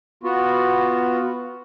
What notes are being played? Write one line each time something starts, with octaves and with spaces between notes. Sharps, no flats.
B3 F4 F#4